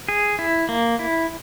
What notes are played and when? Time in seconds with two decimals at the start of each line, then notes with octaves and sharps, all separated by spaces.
0.09 G#4
0.39 E4
0.69 A#3
0.99 E4